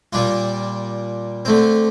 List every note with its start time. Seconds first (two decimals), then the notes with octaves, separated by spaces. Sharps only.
0.13 A#2 G3 D4 F4
1.45 D3 A3 C4